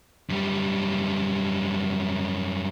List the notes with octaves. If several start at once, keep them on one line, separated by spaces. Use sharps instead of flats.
F#2 G3